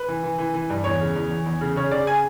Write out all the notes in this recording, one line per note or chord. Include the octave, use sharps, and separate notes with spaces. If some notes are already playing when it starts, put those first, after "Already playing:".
Already playing: B4
E3
E3
E3
E3
G2
E2 C#5
C#3
E2
E2
E2
C#3
C#3 C#5
C#3 D5
G#5